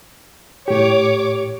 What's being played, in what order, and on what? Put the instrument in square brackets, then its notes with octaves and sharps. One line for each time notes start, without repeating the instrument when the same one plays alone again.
[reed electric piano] A2 G4 [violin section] C#5 D6